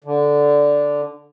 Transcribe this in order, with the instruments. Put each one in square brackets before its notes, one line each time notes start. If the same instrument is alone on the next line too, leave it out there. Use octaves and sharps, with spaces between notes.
[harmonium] D3